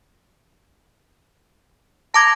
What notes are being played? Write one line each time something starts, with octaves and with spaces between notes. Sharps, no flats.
A5 A#5 D6 G#6